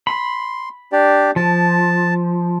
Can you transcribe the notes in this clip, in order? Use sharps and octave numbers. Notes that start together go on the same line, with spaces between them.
B5 C6
D4 G4 D5
F3 A5